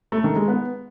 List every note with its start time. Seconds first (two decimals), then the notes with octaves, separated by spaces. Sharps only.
0.12 A3
0.24 D#3
0.36 G#3
0.48 B3